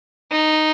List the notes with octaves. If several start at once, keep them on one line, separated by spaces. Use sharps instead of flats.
D#4